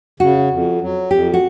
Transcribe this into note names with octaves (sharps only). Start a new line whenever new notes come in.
C#3 F#4
F2
F#3
F2 G4
F#4